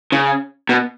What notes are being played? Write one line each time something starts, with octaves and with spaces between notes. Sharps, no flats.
C#3
B2